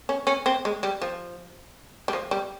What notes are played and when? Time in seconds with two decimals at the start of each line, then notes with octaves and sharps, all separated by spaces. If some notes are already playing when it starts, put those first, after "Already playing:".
0.09 C#4
0.27 C#4
0.46 C4
0.65 G#3
0.83 G3
1.02 F3
2.08 G3
2.13 F3
2.31 G3